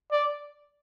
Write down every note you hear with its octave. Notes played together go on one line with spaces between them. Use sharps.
D5